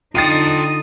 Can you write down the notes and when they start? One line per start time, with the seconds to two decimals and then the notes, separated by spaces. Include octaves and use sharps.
0.15 D3 D#4 F4 G5 D#6 A6 C7 D#7